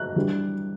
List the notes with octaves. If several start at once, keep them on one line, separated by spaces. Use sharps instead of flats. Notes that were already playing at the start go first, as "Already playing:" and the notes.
Already playing: F#6
E3 G3 D4